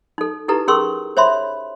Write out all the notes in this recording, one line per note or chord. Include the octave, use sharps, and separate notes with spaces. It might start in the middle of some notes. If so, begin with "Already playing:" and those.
D#4 A4
D#4 E4 G4 A4 B4 A#5
C#4 G#4 A#4 C6 C#6 E6
C5 C#5 E5 B5 C6